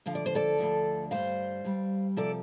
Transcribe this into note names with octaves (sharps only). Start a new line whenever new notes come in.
D2 D3 F3 F5
D5
C5
A4 D5
D2 D3 F3
G2 G3 C5 F5
G2 G3
C3 F3 A4 D5